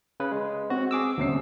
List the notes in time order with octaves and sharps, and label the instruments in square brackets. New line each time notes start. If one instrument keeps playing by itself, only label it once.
[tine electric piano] C#3 B4
G#3
[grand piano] C4 [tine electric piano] F#4
[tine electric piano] G#4 D6 E6
[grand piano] D#1 C#4 C7 [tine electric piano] D2 C3